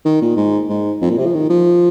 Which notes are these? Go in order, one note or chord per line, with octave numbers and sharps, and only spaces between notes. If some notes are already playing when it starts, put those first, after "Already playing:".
D#3
A#2
G#2
G#2
F2
A#2
C3
F3
D#3
F3